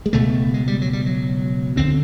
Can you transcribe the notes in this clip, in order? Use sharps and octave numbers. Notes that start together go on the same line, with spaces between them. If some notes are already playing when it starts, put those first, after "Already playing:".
G#3
C#2 B2 A3
G#3
G3
F#3
G3
F#3
D#2 D3 C4